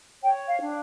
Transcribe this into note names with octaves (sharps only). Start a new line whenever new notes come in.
C#5 G5
F5
D4